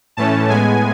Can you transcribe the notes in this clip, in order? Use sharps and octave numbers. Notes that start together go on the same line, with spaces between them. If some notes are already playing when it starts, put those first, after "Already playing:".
A2 E3 A3 C#4 A5
A2 G#3 B3 G#5